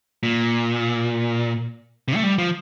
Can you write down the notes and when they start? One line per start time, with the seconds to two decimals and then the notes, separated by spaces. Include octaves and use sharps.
0.23 A#2
2.08 C3
2.16 A3
2.23 G3
2.38 F3